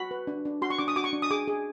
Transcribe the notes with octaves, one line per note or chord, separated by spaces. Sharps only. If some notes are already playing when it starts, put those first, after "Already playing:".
Already playing: F#4 B5
B4
D4
D4
F#4 C6
C#6
D4 D6
D#6
F#4 D6
C#6
D4
D#6
G#4 D6
G#4